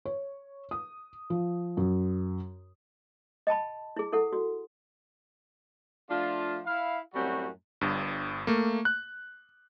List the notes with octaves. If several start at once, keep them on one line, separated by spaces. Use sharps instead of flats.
C#5
D#6
F3
F#2
D#5 G5 A5 B5
E4 G#4
E4 A4 F#5
F#4
F3 A3 D4 F4
E4 F5
F#2 A2 G3 C4 F#4
G1 G2
A3 A#3
F#6